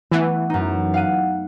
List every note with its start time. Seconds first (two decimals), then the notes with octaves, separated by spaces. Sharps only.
0.11 E3 A3 B3
0.50 F#2 D#4
0.94 F5 F#5 D#7